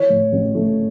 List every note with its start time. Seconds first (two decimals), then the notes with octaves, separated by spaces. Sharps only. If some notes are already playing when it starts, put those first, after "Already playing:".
Already playing: E3 C#5
0.10 A2
0.32 A1
0.55 A3